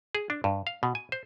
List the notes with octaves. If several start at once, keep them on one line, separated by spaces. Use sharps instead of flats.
G#4
D4
G2
F5
B2
G#5
C5